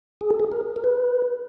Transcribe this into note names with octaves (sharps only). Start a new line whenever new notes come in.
G#4
A4
G#4
A#4
A#4
B4